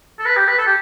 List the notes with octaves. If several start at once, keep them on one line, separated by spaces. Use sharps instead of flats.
A4
B4
G4
B4
A4
G4